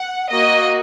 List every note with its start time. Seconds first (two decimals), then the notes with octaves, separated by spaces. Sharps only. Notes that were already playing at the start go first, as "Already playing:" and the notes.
Already playing: F#5
0.29 A#3 F#4 D#5